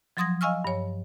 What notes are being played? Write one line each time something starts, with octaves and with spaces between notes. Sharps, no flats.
F3 F#3 C6 D#6 G#6 A#6
D#5 F5 G#5 C#6 E6 F6
G2 C#5